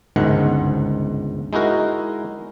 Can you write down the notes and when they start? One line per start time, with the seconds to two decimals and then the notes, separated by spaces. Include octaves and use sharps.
0.16 G1 C#2 G#2 D#3 F#5
1.53 G#3 D#4 E4 F#4 A#4